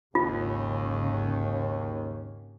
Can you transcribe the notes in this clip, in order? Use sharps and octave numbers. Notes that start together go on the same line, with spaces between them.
G#1 D#2 C#3 C#4 F4